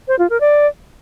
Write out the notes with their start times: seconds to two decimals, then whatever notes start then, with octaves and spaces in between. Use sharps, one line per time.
0.08 C5
0.19 F4
0.30 A#4
0.40 D5